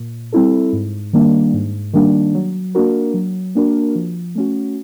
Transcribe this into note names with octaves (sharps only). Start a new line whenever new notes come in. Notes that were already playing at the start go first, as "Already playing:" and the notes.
Already playing: A#2
G3 C4 E4 A4
G#2
D#3 G3 A#3 D4
G#2
D#3 G3 A#3 D4
F#3
A#3 D4 F#4 A#4
F#3
A#3 D4 F#4 A#4
F3
A3 C#4 F#4